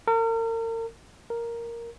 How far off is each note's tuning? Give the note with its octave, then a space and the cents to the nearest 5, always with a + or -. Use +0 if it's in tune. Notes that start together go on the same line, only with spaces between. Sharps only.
A#4 -40
A#4 +0